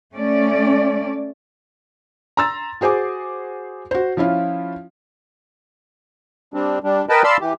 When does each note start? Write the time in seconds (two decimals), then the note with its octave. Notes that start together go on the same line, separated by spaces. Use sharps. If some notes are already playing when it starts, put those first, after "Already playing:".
0.13 A3 C#4 D5
2.37 A#5 C6 E6 A6
2.81 F#4 G#4 C5 G#5 D6
3.91 F#4 C5
4.17 F3 C#4 E4 F4
6.54 G3 C4 D4
6.84 G3 D4
7.09 A#4 B4 D#5 G5 A5 B5
7.24 D5 F5 A5 B5 C6 E6
7.41 E3 G4